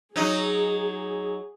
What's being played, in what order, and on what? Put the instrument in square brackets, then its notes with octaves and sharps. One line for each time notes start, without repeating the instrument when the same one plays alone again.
[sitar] F#3 D#4 [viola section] G#4